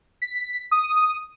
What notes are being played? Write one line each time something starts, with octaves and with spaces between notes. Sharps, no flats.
B6
D#6